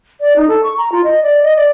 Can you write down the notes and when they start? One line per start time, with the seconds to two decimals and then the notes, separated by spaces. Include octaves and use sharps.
0.21 D5
0.36 D#4
0.48 A4
0.64 C#6
0.78 A#5
0.92 F4
1.04 D#5
1.23 D5
1.43 D#5
1.56 D5